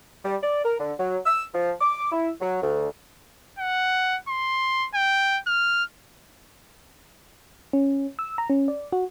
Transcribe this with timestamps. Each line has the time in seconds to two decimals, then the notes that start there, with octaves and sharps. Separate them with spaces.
0.24 G3
0.43 D5
0.64 A#4
0.80 D3
0.99 F#3
1.25 E6
1.54 F3
1.80 D6
2.12 E4
2.41 F#3
2.62 D2
3.59 F#5
4.29 C6
4.94 G5
5.47 F6
7.73 C#4
8.19 E6
8.38 A#5
8.50 C#4
8.68 D5
8.93 F#4